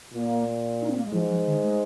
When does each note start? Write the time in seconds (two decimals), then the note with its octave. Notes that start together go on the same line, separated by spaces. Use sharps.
0.14 A#2 A#3
0.82 D#4
0.90 C4
0.97 A#3
1.05 G#3
1.13 G#2 F3
1.30 F3
1.46 D#3
1.63 G#3